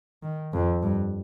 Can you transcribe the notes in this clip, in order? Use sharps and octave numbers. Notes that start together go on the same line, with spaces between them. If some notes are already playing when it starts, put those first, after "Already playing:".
D#3
F2
G2